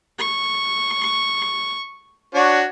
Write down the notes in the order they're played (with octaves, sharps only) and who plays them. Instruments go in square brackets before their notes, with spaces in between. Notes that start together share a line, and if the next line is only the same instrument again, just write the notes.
[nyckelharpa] C#6
[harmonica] D4 F#4 C#5